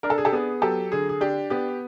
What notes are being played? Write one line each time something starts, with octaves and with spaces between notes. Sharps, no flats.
D4 A#4
A4
G#4
G4 A4
B3 G#4
F#3 G4 A4
D3 G#4
G#4
D4 G4
B3 G4